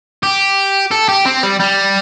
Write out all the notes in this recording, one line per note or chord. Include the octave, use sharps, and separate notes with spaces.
G4
A4
G4
C4
G3
G3